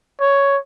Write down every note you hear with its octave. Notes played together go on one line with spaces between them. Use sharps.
C#5